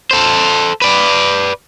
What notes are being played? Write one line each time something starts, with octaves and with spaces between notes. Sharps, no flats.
A4 C5
B4 D5